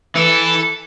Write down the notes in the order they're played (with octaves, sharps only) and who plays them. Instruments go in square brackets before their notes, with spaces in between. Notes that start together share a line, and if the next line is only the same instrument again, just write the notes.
[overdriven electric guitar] E3 [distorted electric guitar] A4